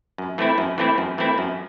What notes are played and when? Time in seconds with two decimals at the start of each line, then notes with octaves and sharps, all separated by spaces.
0.18 F#2
0.38 E3 A3 C4 E4
0.58 F#2
0.78 E3 A3 C4 E4
0.98 F#2
1.18 E3 A3 C4 E4
1.38 F#2